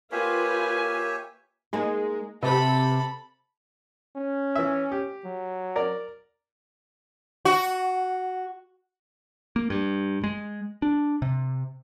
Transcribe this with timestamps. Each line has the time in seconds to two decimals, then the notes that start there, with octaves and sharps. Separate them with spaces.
0.12 A#3 F4 G4 B4 C#5 E5 G#5
1.73 G#3 A#3 D#4 G#4
2.43 C3 F#4 A4 B4 B5
4.16 C#4
4.55 E3 E5
4.92 G4
5.25 F#3
5.76 A#4 D5
7.45 F#4
9.56 A#3
9.70 G2
10.24 G#3
10.82 D4
11.22 C3